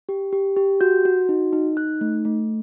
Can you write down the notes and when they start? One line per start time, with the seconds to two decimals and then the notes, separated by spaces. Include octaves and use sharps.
0.09 G4
0.33 G4
0.56 G4
0.81 F#4 G6
1.05 F#4
1.29 D#4
1.53 D#4
1.77 D#4 F#6
2.01 A3
2.25 A3